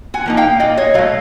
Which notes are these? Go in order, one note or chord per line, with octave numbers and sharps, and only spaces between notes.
F#5 G#5
F3 A#3 D#4
F5 G5
A#2 D#5 F5
C#5 D#5
F#3 A3 D#5 F5